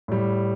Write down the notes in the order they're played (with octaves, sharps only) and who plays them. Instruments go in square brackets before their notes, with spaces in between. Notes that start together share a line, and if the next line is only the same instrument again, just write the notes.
[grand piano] A2 G3